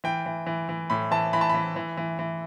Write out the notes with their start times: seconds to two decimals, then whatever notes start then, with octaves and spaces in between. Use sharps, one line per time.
0.04 E3 G5
0.26 E3
0.47 E3
0.69 E3
0.90 A2 B5
1.11 E3 A5
1.33 E3 B5
1.41 A5
1.50 E3 B5
1.76 E3
1.97 E3
2.19 E3